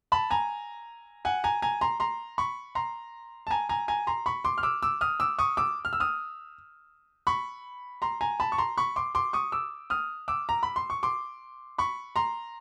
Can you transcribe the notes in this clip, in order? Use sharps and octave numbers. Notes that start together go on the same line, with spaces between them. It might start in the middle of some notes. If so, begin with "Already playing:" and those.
A5 B5
G#5 A#5
F#5 G#5
G#5 A#5
G#5 A#5
A#5 C6
A#5 C6
B5 C#6
A#5 C6
A5
G#5 A#5
G#5 A#5
G#5 A#5
A#5 C6
B5 C#6
C6 D6
F6
D6 E6
D6 E6
D#6 F6
D6 E6
C#6 D#6
D6 E6
F6
E6
D#6 F6
B5 C#6
A#5 C6
G#5 A#5
A5 B5
C#6
A#5 C6
B5 C#6
C6 D6
C6 D6
C#6 D#6
D6 E6
D#6 F6
D6 E6
A#5
B5
C6
C#6
C6 D6
B5 C#6
A#5 C6